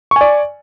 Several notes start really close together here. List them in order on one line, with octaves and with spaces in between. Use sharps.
C#6 G#5 D5